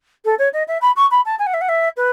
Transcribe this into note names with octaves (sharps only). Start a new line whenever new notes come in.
A4
C#5
D#5
E5
B5
C#6
B5
A5
G#5
F#5
E5
F#5
E5
B4